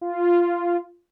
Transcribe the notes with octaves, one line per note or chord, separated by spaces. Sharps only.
F4